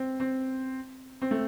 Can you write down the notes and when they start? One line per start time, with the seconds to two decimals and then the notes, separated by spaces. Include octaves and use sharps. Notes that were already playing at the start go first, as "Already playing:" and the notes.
Already playing: C4
0.20 C4
1.22 C4
1.31 A3